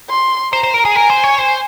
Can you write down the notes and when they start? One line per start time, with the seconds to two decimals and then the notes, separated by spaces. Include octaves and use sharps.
0.10 C6
0.53 C5 A#5
0.63 C5
0.74 A#4
0.85 G#4
0.96 A#4 G#5
1.10 C5
1.24 C#5
1.38 C5